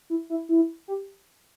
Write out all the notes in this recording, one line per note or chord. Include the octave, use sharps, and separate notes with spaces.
E4
E4
E4
G4